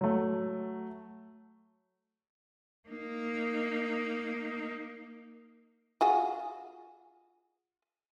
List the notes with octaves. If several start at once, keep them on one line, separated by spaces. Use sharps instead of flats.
F#3 A3
A#3 D#4
F4 F#4 G#4